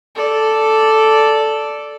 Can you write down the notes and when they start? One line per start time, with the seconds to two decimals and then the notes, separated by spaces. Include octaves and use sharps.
0.15 A4 D5